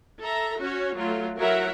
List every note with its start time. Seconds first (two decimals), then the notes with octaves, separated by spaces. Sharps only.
0.21 A4 E5 A#5
0.60 C#4 F#4 C#5
0.96 F#3 A3 F4
1.39 F#3 E4 F#4 A#4 E5 F#5